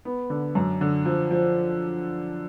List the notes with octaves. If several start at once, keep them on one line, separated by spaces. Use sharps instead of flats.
B3
D3
F#2
D3
F3
F3